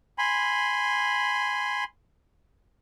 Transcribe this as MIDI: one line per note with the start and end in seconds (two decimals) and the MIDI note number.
0.18 1.84 80
0.18 1.84 83
0.18 1.84 84